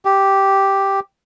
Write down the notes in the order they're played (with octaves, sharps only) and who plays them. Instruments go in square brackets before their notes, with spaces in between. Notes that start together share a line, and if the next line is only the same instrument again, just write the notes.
[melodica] G4